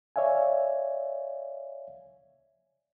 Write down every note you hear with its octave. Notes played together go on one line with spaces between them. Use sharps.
C#5 D5 E5 F5 G#5